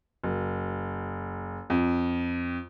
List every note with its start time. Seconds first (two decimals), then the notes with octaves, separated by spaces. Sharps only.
0.24 F#1
1.70 F2